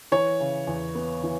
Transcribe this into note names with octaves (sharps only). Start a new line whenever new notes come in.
E3 C#5
C#3
E2
B3
E3